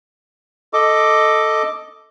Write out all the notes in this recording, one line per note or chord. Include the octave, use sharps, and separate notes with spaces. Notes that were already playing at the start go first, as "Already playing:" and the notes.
A4 D#5 D6